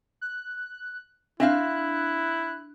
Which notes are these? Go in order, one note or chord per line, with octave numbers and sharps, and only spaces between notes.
F#6
C4 D4 E4 E5 F5 F#6